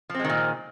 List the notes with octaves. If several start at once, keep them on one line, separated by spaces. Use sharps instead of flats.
A#2 D#3 F3 G#3 C4